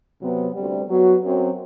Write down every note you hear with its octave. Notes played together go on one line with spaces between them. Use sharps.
C3 F#3 B3
D2 C3 G3
F#3 B3 F#4
F#2 F#3 C4